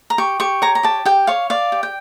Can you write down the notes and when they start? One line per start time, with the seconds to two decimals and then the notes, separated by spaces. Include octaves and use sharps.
0.10 A#5
0.18 G4 C#6
0.40 G4 C#6
0.62 C#5 A#5
0.75 A#5
0.83 G4 A5
1.05 G4 G5
1.27 C#5 F5
1.50 D5 F5
1.72 G4
1.83 G5